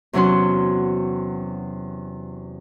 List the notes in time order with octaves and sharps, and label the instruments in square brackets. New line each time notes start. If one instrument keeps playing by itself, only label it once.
[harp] E2 C3 F#3 C#4 F#4 C6